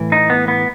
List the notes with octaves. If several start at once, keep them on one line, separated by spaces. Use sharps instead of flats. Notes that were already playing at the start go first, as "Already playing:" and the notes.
Already playing: A2 E3
D#4
B3
B3